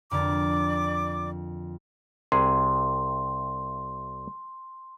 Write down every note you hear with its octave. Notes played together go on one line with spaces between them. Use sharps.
F2 D3 A#4 D5 D6
C2 C3 G#4 C6